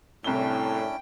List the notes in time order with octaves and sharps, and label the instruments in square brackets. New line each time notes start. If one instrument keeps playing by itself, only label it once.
[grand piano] C2 G7 [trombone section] A2 [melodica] C#4 D4 E4 [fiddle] G5